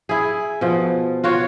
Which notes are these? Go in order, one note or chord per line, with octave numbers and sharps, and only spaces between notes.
E4 G#4
B2 F3
F4 F#4 C#5